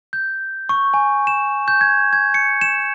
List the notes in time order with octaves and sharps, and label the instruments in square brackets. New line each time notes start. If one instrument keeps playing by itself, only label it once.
[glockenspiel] G6
C#6
G#5
E7
G6
G#6
G#6
C#7
E7